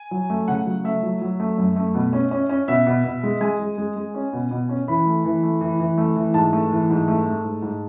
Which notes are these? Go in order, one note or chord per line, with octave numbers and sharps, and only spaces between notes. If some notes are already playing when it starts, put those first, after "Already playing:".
Already playing: G#5
F#3
A3
C#3 F#5
F#3
A3 E5
F#3
F#3
A3
F#2
A3
B2
C#4
C#4
C#4
B2 E5
B2
B2
G#3
G#3 G#5
G#3
G#3
G#3
C#4
B2
B2
C#4
E3 B5
A3
E3
A3
E3
E3
A3
E3
G#2 A5
A3
E3
G#2
A3
A3
G#2
G#2